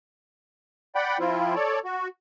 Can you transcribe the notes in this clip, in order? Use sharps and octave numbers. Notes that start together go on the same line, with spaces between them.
D5 F#5 G5 B5
F3 C4 E4 F4
A4 C#5 D5
F#4